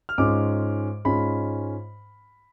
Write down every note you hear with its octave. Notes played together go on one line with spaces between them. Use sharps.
F6
G#2 G#3 C#4 F4 D6
G#2 G#3 C#4 F4 B5